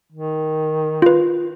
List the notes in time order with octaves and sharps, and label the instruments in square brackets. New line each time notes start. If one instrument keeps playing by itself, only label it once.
[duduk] D#3
[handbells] F4 B4